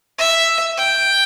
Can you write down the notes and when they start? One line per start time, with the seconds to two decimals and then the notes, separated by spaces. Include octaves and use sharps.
0.19 E5
0.77 G5